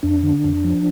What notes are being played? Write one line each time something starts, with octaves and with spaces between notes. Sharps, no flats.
F2 D4
D3
F2
F3